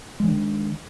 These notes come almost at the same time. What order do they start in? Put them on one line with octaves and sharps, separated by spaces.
G#3 E3 D4 D#3